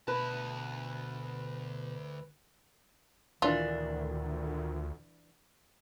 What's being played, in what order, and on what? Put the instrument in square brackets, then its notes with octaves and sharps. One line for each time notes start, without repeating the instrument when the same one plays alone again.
[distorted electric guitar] D2 A5 [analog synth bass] B2 [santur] B4
[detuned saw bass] D2 [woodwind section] A#2 D#3 [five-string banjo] E3 D4 [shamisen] F4